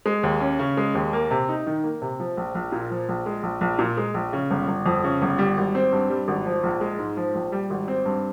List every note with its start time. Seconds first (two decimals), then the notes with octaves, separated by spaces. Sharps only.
0.06 G#3
0.23 D#2
0.41 C#4
0.59 C#3
0.77 G#3
0.95 D#2
1.13 A#3
1.31 C3
1.49 D#4
1.67 D#3
1.84 A#3
2.02 C3
2.20 F3
2.37 A#1
2.55 A#1
2.72 A#2
2.91 F3
3.09 A#1
3.26 G#3
3.43 A#1
3.61 A#1
3.79 A#2
3.97 G#3
4.14 A#1
4.33 C#3
4.51 G1
4.68 G1
4.86 F2
5.04 C#3
5.22 G1
5.39 G3
5.57 G#1
5.75 C4
5.92 G2
6.10 G3
6.28 G#1
6.46 F3
6.63 A#1
6.81 G#3
6.99 G#2
7.17 F3
7.35 A#1
7.52 G3
7.70 G#1
7.88 C4
8.05 G2